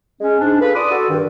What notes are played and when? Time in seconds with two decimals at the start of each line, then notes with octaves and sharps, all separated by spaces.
0.21 G#3 C#4
0.40 G#2 D4
0.61 F4 G#4 A4 B4
0.75 D5 B5 C6 D6 D#6
0.91 F#4 A4
1.10 G2 D#3